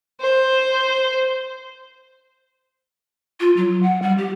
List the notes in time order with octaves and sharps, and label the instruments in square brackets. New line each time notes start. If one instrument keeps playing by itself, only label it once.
[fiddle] C5
[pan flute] F4
F#3
F#5
G3
G4